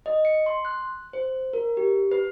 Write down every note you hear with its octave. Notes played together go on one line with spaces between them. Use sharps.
D#5
C#7
C6
F#6
C5
A#4
G4
B4